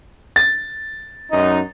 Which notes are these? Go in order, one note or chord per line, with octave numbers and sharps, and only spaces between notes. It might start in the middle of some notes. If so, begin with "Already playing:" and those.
A6
F#2 D#4